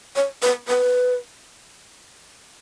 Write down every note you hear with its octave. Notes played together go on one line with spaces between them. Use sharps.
C#5
B4
B4